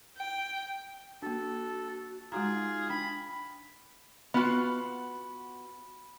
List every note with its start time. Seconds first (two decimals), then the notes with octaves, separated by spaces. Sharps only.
0.18 G5
1.22 A#3 D4 F#4 A4
2.32 G#3 D#4 F4 F#4 G#4 A#5
2.89 D4 G5 B5
4.34 B3 F4 F#4 B5